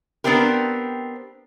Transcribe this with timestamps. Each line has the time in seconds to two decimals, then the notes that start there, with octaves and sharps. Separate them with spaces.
0.24 B3 C4 D4 G4 A#4